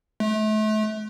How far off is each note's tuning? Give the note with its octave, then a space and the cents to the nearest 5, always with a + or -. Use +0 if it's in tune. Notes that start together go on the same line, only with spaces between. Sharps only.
A3 -35